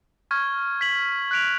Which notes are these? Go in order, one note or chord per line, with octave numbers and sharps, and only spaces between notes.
C#6 F6 G#6
G#6 B6 F#7
F#6 B6 D7 F7